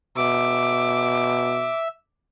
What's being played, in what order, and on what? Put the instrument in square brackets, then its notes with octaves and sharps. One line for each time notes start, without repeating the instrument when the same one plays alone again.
[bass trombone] B2 [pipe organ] E5 [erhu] D6